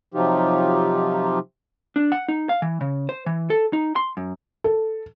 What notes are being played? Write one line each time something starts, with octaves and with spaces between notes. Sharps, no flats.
C3 F3 F#3 D#4 F4 G4
D4
F#5
D#4
F5
E3
C#3
C5
E3
A4
D#4
C6
F#2
A4